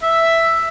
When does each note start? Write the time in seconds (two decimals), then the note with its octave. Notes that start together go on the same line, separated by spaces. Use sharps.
0.02 E5